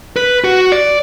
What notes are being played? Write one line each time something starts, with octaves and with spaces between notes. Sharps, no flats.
B4
F#4
D5